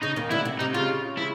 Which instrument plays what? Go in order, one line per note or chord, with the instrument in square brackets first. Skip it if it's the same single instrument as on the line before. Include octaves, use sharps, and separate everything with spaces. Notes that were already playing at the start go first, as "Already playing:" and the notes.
[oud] C#3 [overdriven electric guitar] D#4
[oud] D#2 D#3
[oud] D2 D3 [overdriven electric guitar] E4
[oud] C3
[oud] C3 [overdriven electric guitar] D#4
[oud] C#3 [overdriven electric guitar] F4
[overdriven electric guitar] E4